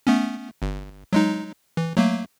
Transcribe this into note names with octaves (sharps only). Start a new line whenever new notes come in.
A3 B3 C#4
G1
F#3 G#3 D#4
E3
F#3 A3 A#3